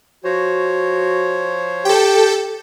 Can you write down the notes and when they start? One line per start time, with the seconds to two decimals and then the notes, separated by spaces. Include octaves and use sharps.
0.24 F3 F#4 C5 C#5
1.85 G4 A4 G5